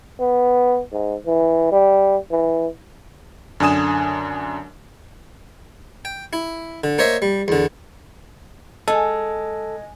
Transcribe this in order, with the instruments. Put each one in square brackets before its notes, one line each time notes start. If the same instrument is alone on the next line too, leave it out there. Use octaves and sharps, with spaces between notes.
[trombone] B3
G#2
E3
G3
E3
[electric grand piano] F#2 D3 D4 G#5 D#6 E7
[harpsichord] G5
E4
D3
A#3 C5 C#5 D#5 E5
G3
E2 D3
[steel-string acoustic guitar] G#3 [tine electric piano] A4